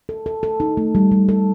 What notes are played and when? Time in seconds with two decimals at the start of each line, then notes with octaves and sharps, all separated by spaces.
0.09 A4
0.26 A4
0.43 A4
0.60 D#4
0.77 A3
0.95 G3
1.12 G3
1.29 A4